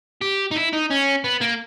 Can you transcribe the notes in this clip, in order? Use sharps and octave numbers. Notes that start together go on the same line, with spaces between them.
G4
D#4
E4
D#4
C#4
B3
A#3